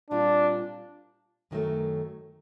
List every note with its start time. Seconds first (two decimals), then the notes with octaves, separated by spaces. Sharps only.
0.10 A#2 G3 C4 D4 F4
1.51 F#2 D#3 F#3 A3